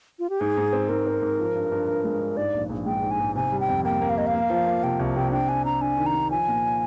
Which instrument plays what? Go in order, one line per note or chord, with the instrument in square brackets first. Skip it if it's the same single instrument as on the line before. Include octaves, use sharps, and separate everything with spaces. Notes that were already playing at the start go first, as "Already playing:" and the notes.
[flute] F4
G4
[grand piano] G#2 [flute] G#4
[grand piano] G#2
C4
[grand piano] G#2 [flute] A#4
[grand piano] C4
G#2
F3
G2
G2
G2
G#3
G2
[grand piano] G#2 [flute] D5
[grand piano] A#1
A#1
[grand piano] G#3 [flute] G5
[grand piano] G#2
[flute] G#5
[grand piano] G#2
[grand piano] C3 [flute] G#5
[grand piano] G3
[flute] G5
[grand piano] F2
[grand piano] A#3 [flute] G5
[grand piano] A#3
[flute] F5
[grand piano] A#3 [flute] D#5
[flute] F5
[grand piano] A#3
F3
A#3
[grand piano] C3 [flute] G5
[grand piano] C2
[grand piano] C3 [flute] G5
[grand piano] D4 [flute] G5
[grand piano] D4 [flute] G#5
[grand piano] D4 [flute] A#5
[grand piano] D4 [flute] G#5
[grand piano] D#3
[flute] A#5
[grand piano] D4
[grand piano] F3 [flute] G#5
[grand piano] A#2